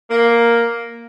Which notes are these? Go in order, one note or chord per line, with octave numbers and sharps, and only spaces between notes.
A#3